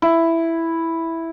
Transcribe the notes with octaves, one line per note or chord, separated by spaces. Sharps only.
E4